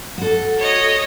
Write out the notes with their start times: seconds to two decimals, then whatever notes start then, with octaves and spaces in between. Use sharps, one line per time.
0.18 F#4 A4
0.58 C#5 D#5